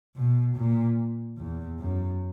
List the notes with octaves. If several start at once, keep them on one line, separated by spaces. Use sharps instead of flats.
B2
A#2
E2
F#2